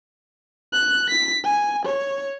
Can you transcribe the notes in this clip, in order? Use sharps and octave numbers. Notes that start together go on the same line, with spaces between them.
F#6
B6
G#5
C#5